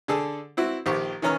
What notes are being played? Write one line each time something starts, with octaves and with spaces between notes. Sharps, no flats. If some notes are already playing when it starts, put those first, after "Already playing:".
D3 G#4 A4
C4 E4 F#4
A#1 D#3 G4 C5 C#6
D#3 E3 C#4 C#5 A#5 F6